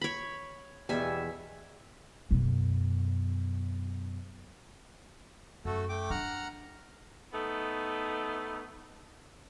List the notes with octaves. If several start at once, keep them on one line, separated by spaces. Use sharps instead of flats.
C#5 B5
E2 B2 G3 E5 G#5
F#2 B2
F#2 A3 F#4 A4
A3 G5 D6
F3 D4 F#5 A#5 F6
A3 B3 D#4